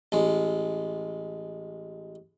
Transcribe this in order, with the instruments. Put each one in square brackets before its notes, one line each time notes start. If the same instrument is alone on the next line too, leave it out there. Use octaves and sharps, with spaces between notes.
[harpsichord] A1 G#3